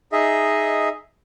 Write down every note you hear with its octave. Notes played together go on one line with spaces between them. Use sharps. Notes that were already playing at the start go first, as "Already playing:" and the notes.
D#4 G#4 D#5 E5